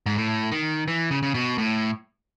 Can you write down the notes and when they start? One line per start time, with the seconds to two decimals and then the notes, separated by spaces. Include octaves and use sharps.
0.06 G#2
0.17 A2
0.51 D#3
0.88 E3
1.11 C#3
1.23 C#3
1.34 B2
1.58 A2